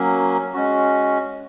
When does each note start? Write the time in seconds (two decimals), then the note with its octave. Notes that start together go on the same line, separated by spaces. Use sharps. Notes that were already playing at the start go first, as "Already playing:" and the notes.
Already playing: F#3 A#3 C#4
0.54 G#3 C#4 F#4